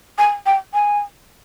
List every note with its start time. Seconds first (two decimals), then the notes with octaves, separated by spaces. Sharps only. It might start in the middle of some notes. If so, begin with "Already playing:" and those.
0.18 G#5
0.46 G5
0.74 G#5